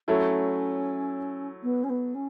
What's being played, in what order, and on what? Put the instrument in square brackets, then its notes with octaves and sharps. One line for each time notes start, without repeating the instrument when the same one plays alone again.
[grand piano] F#3 A3 E4 [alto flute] C#4
[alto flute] B3
C#4
B3
C#4